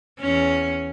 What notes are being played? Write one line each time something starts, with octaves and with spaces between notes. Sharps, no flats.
E2 C#4